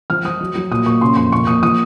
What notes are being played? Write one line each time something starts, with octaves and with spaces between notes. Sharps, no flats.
F3 F6
F3 D#6
F#3
F#3
A#2 D#6
A#2 C#6
C#3 C6
F2 C6
A#2 C#6
A#2 D#6
F3 D#6